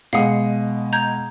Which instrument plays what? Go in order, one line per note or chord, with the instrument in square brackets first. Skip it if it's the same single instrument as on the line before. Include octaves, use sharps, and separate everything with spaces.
[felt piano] B2 G#3 D#6 [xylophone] F5 F#5
[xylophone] A#5 G6 G#6